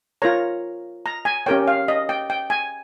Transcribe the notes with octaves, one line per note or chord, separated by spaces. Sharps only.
F4 A#4 C#5 A#5
A#5
G#5
C#4 G4 A#4 C#5 G5
F5
D#5
G5
G5
G#5